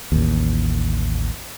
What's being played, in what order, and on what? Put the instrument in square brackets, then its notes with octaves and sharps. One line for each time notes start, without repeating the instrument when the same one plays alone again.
[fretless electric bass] A1 D#2